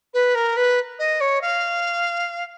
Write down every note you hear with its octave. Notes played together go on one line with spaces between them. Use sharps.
B4
A#4
B4
D#5
C#5
F5